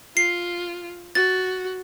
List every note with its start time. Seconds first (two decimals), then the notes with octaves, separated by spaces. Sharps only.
0.17 F4 C7
1.15 F#4 A6